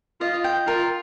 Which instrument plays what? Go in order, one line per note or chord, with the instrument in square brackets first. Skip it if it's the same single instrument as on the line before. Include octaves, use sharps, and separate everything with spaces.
[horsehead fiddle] F4 [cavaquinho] D#5
[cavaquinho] G5
[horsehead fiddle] F4 [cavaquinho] A#4